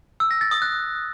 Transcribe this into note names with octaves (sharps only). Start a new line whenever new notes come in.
E6
A#6
A6
D#6
F#6